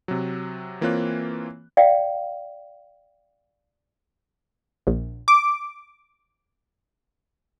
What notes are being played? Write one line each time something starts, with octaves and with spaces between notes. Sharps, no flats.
C3 F#3
E3 A#3 C4 F4 C#5 F#6
D5 F5 G5
A#1
D6